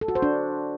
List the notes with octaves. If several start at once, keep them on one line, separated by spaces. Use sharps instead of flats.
A4
F#4
C5
D4